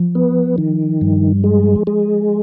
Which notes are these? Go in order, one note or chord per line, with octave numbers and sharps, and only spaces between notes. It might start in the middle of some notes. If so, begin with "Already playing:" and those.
Already playing: F3
B3
D#3
G2
G#3
G#3